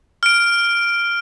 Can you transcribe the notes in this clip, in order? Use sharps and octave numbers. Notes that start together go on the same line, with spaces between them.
F6 D7